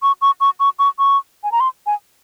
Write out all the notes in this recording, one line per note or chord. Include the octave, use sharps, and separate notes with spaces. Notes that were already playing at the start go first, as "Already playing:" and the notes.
C#6
C#6
C#6
C#6
C#6
C#6
G#5
A#5
C6
G#5